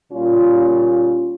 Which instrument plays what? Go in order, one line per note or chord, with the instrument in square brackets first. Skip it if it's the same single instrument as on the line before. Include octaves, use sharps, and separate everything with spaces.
[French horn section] A#2 G3 C#4 F4